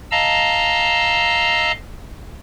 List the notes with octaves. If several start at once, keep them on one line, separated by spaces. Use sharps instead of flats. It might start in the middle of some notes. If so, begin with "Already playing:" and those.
D#5 F5 A5 A#5 E6